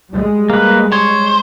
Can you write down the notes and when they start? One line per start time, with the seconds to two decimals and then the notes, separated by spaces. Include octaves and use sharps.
0.11 G3 G#3
0.50 A#3 B4
0.92 C5 C#5